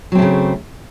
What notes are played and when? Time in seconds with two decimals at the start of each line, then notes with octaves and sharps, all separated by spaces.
0.12 F#3
0.15 C4
0.19 A3
0.22 C#3